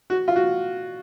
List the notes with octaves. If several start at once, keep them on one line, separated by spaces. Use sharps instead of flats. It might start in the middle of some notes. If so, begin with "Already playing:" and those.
F#4
F4
F#4